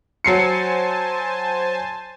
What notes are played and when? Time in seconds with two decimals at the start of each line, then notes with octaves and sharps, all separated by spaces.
0.24 F#3 C5 G#5 A5 C7 C#7